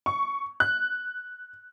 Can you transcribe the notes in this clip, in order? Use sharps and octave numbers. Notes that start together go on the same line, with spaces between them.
C#6
F#6